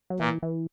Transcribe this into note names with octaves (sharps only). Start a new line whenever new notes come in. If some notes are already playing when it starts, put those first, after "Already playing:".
F#3
A#2 E3
E3